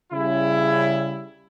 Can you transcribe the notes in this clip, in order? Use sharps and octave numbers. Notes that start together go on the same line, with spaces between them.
C#3 G3 E4